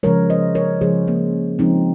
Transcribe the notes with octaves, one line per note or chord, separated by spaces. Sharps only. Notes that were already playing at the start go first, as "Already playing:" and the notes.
C#3 F3 G#3 A#4 C#5
C5 D#5
A#4 C#5
C#3 F3 G#3 G#4 C5
A#3 C#4
C#3 F3 G#3 C4 D#4